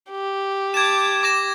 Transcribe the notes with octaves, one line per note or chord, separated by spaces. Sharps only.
G4
A5 D6 G#6 E7
D6 A#6 E7